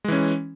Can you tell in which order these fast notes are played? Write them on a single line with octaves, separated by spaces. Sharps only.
G#3 E3 C#4